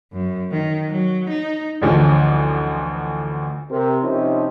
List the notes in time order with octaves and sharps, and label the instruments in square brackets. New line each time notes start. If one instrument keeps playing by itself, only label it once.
[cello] F#2
D#3
F#3
D#4
[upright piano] A1 D2 F3
[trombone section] C3 A#4
C3 F3 C#4 D#4 E4 G4